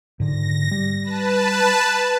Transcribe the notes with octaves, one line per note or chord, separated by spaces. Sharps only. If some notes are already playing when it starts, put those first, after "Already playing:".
G#2 D3 A#6
G3
B4 A5